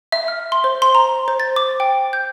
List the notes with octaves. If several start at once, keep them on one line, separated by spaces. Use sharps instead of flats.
E5
F6
C6
C5
C6
A#5
C5
A6
D6
G5
G6